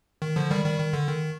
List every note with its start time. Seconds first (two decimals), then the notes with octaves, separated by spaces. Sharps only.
0.22 D#3
0.36 D3 F3
0.51 D#3 G3
0.65 D#3 G3
0.79 D#3
0.93 D3
1.08 D#3